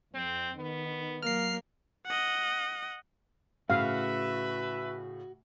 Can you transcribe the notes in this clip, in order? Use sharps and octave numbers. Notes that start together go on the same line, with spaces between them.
F2 C4
D#3 B3
F#3 A#3 F6 C7
D#5 F#5
A2 C#3 F#4 B4 E5 F5